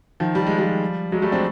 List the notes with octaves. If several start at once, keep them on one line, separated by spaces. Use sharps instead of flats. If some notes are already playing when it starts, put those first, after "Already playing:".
D#3 F3
G3
G#3
F3 G3
F#3 G#3
G3 A3
C4 D4